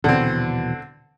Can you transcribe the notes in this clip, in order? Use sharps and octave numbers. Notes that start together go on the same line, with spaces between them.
D#1 B2 D3 E3 C4